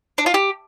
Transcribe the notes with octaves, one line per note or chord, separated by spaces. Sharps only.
D4
F4
G4